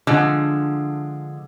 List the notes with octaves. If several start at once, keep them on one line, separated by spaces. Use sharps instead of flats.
D3 F3 G#3